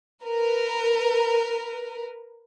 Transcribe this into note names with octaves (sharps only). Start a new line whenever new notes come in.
A#4 B4